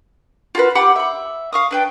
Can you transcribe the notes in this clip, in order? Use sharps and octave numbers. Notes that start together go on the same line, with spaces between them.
F4 F#4 G#4 B4
G4 F#5 B5 D6
E5 B5
F5 C#6 D#6
D4 B4 G5